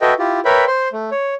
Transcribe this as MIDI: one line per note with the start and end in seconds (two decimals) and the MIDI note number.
0.01 0.14 66
0.01 0.14 69
0.01 0.14 71
0.01 0.14 75
0.01 0.14 76
0.01 0.14 79
0.19 0.40 64
0.19 0.40 65
0.19 0.40 67
0.45 0.65 70
0.45 0.65 71
0.45 0.65 73
0.45 0.65 76
0.45 0.65 79
0.45 0.65 83
0.67 0.88 72
0.67 0.88 84
0.93 1.10 57
1.12 1.35 73